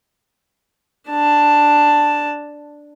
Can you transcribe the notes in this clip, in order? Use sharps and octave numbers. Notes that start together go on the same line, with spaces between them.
D4 A5